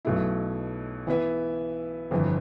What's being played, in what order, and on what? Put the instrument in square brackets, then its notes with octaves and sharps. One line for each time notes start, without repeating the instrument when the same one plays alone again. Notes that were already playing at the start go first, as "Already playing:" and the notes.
[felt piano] B1 B2 A3 E4
E3 B3 E4 B4 E5
G1 F2 E3